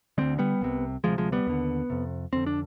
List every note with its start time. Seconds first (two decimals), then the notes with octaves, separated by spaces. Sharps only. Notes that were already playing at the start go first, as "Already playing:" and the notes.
0.18 D2 D3 G#3 C4
0.39 G3 B3
0.61 C2 C3
1.04 D2 C3 F3 G#3
1.18 F3 G#3
1.32 G3 B3
1.47 D#2 D3
1.90 F2 C3
2.33 F2 D3 C4
2.46 D4